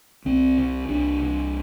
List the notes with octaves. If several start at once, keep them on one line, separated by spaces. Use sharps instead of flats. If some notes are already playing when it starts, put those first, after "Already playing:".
C2 C4
C3
C2 D4
C3